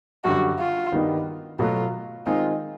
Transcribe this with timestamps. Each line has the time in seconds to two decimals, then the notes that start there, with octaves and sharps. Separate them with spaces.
0.24 F#2 D3 G3 F#4
0.59 F4
0.92 G2 D#3 G3 B3 D#4
1.59 B2 F#3 A3 F4
2.26 D#3 G#3 C4 D#4 F4